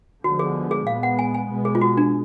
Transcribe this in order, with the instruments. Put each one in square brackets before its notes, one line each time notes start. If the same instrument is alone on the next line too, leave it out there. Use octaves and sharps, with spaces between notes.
[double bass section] D3 F3 G#3 B3 [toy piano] F#4
[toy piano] G#4
G#4
[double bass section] A#2 G#3 B3 [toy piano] F5
[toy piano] F#5
G#5
G#5
[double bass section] B2 G#3 B3
[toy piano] G#4
F4
F#4
D4